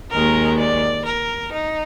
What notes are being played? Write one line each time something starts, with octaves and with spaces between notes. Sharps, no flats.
D#2 D#3 G#3 A#4
D5
A#4
D#4